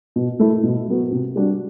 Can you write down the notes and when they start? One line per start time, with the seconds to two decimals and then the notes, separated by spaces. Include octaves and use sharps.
0.16 B2
0.40 A3 E4
0.63 B2
0.88 F#3 B3 F#4
1.11 C3
1.36 G3 D4 F#4